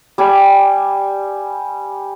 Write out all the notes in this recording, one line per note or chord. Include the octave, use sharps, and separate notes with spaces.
G3 G#5 D6